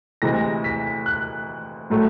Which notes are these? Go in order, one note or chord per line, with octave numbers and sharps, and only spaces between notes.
D2 C3 E3 G#3 A#6
B6
F#6
A2 F#3 A3